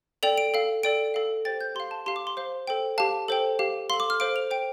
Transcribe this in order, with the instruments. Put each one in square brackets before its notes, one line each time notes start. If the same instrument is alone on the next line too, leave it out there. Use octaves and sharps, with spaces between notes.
[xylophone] A4 D5 G5 F7
D7
A4 F5
A4 D5 G5 D7
A4 F5
G4 C5 G5 A6
G6
G4 F5 C6
A5
G4 F5 C6
D6
C6
C5 F5
A4 C5 G5
G4 F5 A5
A4 C5 G5
G4 F5
A4 F5 C6
D6
F6
A4 C5 F5 D7
F7
C5 G5 D7